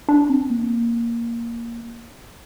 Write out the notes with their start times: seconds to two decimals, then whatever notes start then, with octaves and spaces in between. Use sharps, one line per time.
0.09 D4
0.29 C4
0.50 A#3